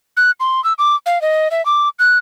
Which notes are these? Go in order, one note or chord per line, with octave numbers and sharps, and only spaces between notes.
F#6
C6
E6
D6
F5
D#5
E5
D6
F#6